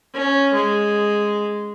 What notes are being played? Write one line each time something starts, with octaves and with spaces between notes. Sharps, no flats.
C#4
G#3